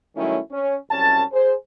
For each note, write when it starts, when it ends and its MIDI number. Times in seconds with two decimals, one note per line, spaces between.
0.16 0.38 51
0.16 0.38 54
0.16 0.38 55
0.16 0.38 57
0.16 0.38 61
0.16 0.38 64
0.51 0.75 61
0.90 1.22 36
0.90 1.22 42
0.90 1.22 61
0.90 1.22 81
1.33 1.54 68
1.33 1.54 72